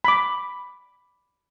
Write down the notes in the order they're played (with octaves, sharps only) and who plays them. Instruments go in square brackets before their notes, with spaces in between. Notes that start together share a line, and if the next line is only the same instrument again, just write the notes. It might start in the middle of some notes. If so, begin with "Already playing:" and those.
[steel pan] B5 D6